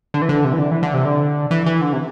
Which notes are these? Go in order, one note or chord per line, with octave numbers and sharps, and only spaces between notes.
D3
E3
D3
C3
E3
D3
E3
D3
C3
D3
E3
E3
D3
C3